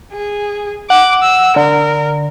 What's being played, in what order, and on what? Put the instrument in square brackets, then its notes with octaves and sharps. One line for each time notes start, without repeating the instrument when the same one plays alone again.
[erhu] G#4
[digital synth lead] F#5 [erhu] D6
[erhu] E6
[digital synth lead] D3 [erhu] A#4